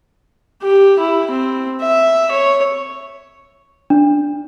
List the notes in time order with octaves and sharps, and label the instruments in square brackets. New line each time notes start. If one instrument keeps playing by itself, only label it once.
[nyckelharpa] G4
E4
C4
E5
C#5
[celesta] D4